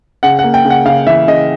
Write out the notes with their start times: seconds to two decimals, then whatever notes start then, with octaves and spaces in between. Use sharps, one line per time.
0.23 C#3 F#5
0.39 F#5
0.44 A#3
0.54 G5
0.65 C#3
0.70 F#5
0.85 C#3 F5
1.07 E3 E5
1.27 C#3 D#5